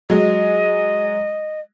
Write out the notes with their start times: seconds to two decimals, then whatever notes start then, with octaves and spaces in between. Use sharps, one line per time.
0.10 F#3 G#3 D#5